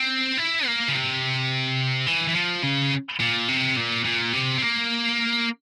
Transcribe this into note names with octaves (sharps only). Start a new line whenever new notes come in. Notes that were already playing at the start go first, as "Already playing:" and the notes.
Already playing: C4
E4
A#3
C#3
C3
E3
E3
F3
C#3
A#2
C3
A#2
A#2
C3
C4
A#3